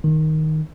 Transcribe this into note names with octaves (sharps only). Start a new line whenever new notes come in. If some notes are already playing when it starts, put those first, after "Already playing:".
D#3